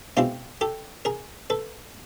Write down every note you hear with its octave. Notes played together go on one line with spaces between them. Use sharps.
B2 G#3 C4 E4 F4 G4
G4 A4
G#4 A#4
A4 B4